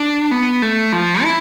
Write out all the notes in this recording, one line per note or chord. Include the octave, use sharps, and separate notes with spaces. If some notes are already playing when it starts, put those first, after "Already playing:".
Already playing: D4
B3
A3
F3
E4